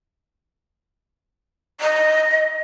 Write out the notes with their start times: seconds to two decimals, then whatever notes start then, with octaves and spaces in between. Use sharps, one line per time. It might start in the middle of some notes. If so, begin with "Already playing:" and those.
1.81 D#5